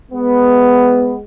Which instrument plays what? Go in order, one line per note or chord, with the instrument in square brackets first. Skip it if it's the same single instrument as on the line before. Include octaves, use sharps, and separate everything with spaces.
[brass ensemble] G#3 B3